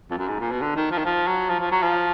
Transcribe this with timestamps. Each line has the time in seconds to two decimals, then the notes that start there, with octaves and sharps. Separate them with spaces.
0.11 F2
0.17 F#2
0.28 G#2
0.40 A#2
0.51 B2
0.61 D3
0.76 D#3
0.91 F3
0.98 D#3
1.05 F3
1.27 F#3
1.49 F3
1.60 F3
1.71 F#3
1.82 F3